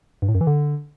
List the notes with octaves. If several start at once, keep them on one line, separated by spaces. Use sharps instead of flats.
G2
A2
F#2
E3
D3